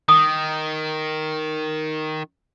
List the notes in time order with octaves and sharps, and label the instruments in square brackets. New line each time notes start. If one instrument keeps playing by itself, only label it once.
[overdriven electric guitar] D#3 [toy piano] D#6